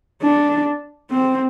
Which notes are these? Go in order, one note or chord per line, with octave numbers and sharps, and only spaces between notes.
D4
C4